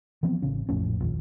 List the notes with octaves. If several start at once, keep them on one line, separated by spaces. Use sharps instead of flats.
E3 F3 B3 C4
A1 C#3 C#4
A#1 F2 A2 C#4
A#1 D#2